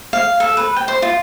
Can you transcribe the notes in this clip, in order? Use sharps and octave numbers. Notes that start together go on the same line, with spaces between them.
F5
A4
B4
G5
C5
F4